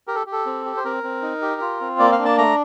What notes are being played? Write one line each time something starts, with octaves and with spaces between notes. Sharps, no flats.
G4 A#4
A4
G4
A4
C4
G4
C5
C4 A#4
C4
D#4
G4
F4
C4
A#3 D5
F5
D4
A5
A3 A#5